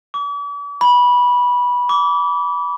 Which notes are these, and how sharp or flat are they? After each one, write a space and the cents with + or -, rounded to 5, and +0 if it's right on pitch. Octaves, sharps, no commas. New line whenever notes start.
D6 -45
B5 -15
D6 -30